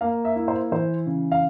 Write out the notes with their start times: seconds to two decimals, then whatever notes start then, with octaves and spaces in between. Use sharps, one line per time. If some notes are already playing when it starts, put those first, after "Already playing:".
0.01 A#3 F5
0.25 E5
0.36 E4
0.48 C5
0.72 E3 C5
1.06 C#3
1.32 F5